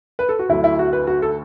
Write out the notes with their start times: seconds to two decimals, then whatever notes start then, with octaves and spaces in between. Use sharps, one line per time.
0.19 B4
0.29 A4
0.39 F#4
0.49 D2 D3 F#3 E4
0.64 E4
0.79 F#4
0.93 B4
1.07 F#4
1.22 A4